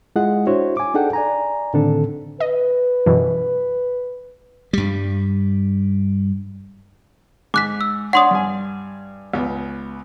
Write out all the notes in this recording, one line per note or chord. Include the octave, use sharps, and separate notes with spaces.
G#3 E4 F4 G#4 D#5 F#5
D4 E4 F#4 C5 C#5
G#5 D6
D4 D#4 G#4 A4 F#5 G5
D5 G#5 A#5
A2 D3 D#3 C4 D4 A4
B4 D#5
F#2 B2 E3
G2 G3
G#2 D6 F#6 B6
E6
D4 C#5 F#5 C6 D#6
G2 G#5
C#2 B3